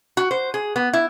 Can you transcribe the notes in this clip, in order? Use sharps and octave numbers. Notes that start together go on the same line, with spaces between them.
F#4
C5
G#4
B3
E4